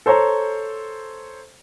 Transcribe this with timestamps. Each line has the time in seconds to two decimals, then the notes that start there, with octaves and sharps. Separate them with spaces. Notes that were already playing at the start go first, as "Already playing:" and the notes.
0.06 A4 C5 C#5 A#5